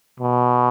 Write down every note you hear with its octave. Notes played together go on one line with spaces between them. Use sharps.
B2